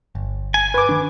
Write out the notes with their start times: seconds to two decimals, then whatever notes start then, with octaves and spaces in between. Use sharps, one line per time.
0.15 G1
0.54 G#5
0.74 B4 D6
0.89 D#3 D4